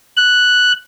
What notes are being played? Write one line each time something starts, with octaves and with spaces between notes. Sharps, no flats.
F#6